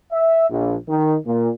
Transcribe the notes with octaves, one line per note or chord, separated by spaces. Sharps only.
E5
A#1
D#3
A#2